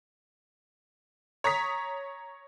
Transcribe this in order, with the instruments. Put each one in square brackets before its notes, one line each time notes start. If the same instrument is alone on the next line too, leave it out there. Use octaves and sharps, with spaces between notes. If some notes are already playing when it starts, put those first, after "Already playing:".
[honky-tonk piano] C#5 A#5 C#6 D#6 B6